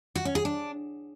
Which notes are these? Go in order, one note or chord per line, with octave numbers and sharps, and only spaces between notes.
F#4
C#4
G#4
D4